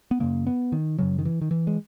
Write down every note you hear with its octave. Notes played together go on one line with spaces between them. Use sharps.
B3
F#2 C#3 A#3
B3
D#3
F#2 C#3 F#3
D#3
E3
D#3
E3
G#3